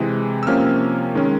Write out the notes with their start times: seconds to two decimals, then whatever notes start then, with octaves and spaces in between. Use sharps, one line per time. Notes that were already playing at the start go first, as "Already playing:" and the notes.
Already playing: C3 E3 G#3
0.43 E6
0.47 C3 F3 A#3 C#4 F6
1.15 D#3 G#3 C#4